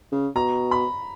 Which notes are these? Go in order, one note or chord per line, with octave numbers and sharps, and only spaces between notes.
C#3
B2 A#5
B5